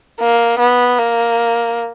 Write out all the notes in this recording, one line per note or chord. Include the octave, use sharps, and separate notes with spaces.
A#3
B3
A#3